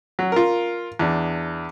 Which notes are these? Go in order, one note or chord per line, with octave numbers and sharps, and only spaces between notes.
F#3
F4 A#4
E2 D4